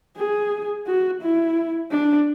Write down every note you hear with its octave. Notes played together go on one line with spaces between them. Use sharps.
G#4
F#4
E4
D4